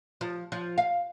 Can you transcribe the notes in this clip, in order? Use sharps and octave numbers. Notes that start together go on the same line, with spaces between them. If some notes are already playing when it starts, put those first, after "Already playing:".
F3
F3
F5